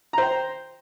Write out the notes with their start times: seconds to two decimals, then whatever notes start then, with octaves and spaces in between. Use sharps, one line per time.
0.13 A#5
0.18 C5
0.22 G5